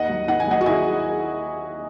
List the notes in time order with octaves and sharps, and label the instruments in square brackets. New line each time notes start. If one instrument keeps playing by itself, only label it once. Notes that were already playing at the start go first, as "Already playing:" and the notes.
Already playing: [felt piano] D#2 D#5 F#5
F#3
D#3 F#5
G#5
F#3 D#5 F#5
F#4
D#3 E4 G#4